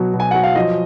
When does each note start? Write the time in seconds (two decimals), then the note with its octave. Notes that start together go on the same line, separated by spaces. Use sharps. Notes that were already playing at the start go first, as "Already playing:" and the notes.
Already playing: B2 F#3
0.14 B2
0.20 G#5
0.31 F#3 F#5
0.43 F5
0.55 F3 D#5